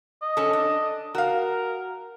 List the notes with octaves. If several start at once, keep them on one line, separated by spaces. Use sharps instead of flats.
D#5
C#4 A4
D4
F#4 A#4 F5